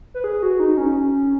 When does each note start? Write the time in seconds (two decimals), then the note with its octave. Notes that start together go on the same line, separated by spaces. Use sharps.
0.14 B4
0.24 G#4
0.43 F#4
0.60 D#4
0.77 C#4